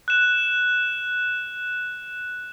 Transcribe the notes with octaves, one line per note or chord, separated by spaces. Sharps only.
F#6 E7